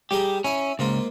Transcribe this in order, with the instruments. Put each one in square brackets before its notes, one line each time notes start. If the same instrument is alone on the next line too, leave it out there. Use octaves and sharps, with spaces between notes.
[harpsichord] G3 G#4 A#5 [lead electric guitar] G4
[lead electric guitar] C#4 [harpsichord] E4 G#5
[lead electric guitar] C#2 [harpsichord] G#2 A#3 F4